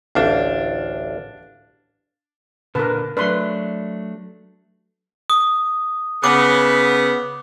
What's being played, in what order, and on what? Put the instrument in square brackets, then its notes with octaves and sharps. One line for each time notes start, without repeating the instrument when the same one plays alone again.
[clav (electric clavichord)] A1 D2 [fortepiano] D4 F5
[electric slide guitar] A#2 D3 A5 [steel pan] A#4 B4
[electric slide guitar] F#3 A3 D4 [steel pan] B4 C6
[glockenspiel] D#6
[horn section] C#3 B3 [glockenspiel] D6